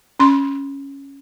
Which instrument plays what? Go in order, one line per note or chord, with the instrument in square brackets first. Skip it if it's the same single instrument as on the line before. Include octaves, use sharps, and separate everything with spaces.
[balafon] C#4 C6